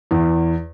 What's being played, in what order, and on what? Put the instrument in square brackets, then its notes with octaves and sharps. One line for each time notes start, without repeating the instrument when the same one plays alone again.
[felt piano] E2